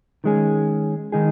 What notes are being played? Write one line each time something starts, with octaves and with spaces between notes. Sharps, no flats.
D#3 G#3 C#4 G#4
D#3 G#3 D#4 G#4